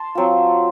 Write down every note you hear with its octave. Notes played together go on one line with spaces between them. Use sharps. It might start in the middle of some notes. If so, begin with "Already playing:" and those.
Already playing: A5 C6
F#3 C4 F4